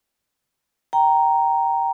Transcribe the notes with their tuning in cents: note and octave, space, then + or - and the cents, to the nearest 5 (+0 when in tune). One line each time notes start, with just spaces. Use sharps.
G5 -10 A#5 +0